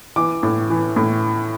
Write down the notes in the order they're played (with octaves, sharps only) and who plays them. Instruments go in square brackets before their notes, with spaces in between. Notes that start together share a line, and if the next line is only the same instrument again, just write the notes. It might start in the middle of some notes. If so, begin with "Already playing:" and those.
[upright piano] E3 D6
A2
E3
A2